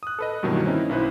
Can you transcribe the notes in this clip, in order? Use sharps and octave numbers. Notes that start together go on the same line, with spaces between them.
D#6 F#6
A4 B4 D#5
G2 B2 D#3 E3 F#3 A#3
A#3 C4 C#4 D#4 E4
B1 E4 B4 C5